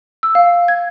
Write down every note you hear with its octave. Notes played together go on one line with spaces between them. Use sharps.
E6
F5
G#6